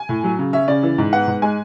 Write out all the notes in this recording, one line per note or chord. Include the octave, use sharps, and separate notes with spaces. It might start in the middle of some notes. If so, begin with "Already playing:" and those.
Already playing: G#5
A2
F#3
C#3
C#4 E5
C#3 D5
E3
G#2
B3 F#5
G#2
G#3 G#5